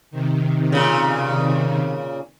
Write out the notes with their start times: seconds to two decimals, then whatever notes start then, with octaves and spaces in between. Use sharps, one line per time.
0.11 C3 D#3
0.72 A#2 C#3